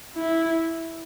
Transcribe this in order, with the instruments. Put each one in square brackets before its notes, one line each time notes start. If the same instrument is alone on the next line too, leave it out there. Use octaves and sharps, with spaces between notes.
[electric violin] E4